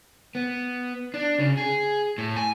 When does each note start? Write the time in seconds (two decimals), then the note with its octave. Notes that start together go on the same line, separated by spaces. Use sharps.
0.35 B3
1.14 D4
1.39 C#3
1.57 G#4
2.18 A2
2.36 G#5